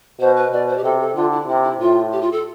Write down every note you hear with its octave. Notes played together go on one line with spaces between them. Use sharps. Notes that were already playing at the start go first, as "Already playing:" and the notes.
B2 C5
B4
B2 D5
C5
G4
C3 A4
A4
D3 F4
E4
C3 E4
E4
A2 F4
G4
F4
A4